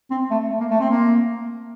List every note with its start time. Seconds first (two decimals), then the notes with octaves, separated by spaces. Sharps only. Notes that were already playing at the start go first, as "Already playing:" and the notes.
0.10 C4
0.31 A3
0.50 A3
0.60 A#3
0.70 A3
0.80 C4
0.90 A#3